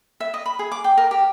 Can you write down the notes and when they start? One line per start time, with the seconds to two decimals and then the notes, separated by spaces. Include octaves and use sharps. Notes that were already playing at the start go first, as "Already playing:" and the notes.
0.20 E5
0.34 D#5
0.46 B5
0.59 G#4
0.72 D6
0.84 G5
0.97 A#4
1.11 G4